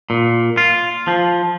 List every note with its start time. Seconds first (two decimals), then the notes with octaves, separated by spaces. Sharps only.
0.10 A#2
0.57 F4
1.08 F3